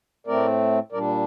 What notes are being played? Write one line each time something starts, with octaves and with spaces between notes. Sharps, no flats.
A2 A3 C4 A#4 D5
A#2 G3 D4 A#4 D5